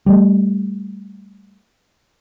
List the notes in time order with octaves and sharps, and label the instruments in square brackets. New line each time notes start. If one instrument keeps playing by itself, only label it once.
[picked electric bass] G3 A3